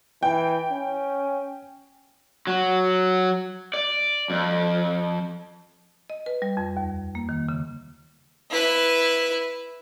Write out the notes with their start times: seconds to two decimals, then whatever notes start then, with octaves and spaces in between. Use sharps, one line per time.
0.23 E3 G5
0.71 C#4
2.47 F#3
3.74 D5
4.30 F2
6.10 D#5
6.26 B4
6.42 G3
6.57 F2
6.77 D#2
7.15 A#3
7.29 D#3
7.49 C#3
8.51 E4 B4